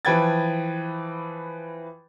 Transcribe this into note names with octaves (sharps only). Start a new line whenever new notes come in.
E3 F3 B4 G5 G#6 A6